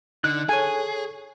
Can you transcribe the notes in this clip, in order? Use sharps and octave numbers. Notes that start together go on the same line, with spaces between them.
D3 D#4 F#6
G#4 A4 C#5 G#5